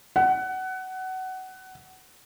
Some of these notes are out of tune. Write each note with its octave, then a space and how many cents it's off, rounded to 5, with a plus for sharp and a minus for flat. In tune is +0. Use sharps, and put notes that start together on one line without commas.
F#5 +20